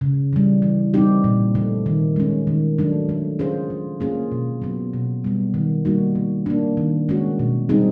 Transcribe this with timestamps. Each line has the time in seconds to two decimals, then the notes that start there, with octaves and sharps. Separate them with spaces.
0.01 C#3
0.33 E3 G3
0.62 E3
0.94 G3 C4 D#4 G4
1.24 A#2
1.55 F3 A3
1.86 D#3
2.16 G#3 C#4
2.47 D#3
2.78 F#3 A3 D4
3.09 A3
3.39 C#4 F4 G#4 C5
3.70 F3
4.00 A#3 C#4 F4 G#4
4.32 B2
4.62 F#3 B3
4.94 B2
5.24 G3 B3
5.54 D#3
5.85 G3 A#3 D#4 F#4
6.15 F3
6.46 A#3 D4
6.77 D#3
7.09 G#3 C#4 F#4
7.39 B2
7.69 G3 C4 D#4 G#4